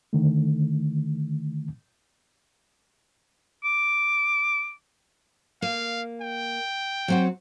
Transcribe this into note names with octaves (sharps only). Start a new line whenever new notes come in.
D3 D#3 A3
D6
A#3 F5
G5
F#3 C4 F#4